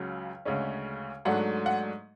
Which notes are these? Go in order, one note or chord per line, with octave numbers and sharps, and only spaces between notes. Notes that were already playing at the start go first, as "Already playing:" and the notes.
Already playing: C#2 C#3 F#3
D2 C#3 G#3 C#4
G#2 F#3 A3 D4 F#5
F#5